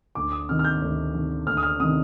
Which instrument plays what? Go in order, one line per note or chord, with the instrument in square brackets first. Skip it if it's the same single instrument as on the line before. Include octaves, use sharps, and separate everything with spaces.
[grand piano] D2 D6
D#6
C3 D#3 F6
F6
G6
D2
C3 D#3
D2 F6
D#6
F6
C3 D#3 D#6